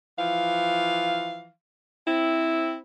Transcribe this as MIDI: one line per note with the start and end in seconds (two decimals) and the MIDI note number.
0.18 1.50 52
0.18 1.50 53
0.18 1.50 77
2.08 2.78 60
2.08 2.78 64